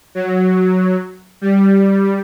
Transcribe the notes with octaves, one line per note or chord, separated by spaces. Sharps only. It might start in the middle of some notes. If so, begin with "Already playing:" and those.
F#3
G3